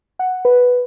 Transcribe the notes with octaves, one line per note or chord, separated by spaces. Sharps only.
F#5
B4